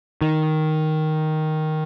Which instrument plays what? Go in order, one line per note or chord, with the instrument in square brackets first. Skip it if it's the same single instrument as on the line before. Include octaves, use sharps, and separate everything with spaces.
[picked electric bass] D#3